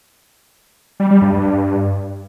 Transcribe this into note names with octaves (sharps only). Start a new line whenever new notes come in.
G3
G3
G2
G2